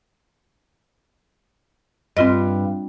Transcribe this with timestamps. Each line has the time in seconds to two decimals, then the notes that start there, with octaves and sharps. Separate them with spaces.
2.17 G2 C4 F4 D#5